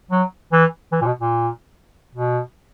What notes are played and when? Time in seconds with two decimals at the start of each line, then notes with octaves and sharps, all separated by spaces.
0.11 F#3
0.52 E3
0.92 E3
1.01 A#2
1.06 B2
1.20 A#2
2.15 B2